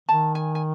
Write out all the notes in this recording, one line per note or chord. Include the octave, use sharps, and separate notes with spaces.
D#3 A5
G#5
G#5